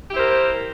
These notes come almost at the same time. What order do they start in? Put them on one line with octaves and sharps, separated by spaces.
G4 E4 C5 A#4